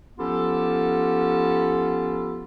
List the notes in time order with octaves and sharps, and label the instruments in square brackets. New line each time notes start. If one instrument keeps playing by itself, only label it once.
[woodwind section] F3 B3 C#4 F4 G4 A4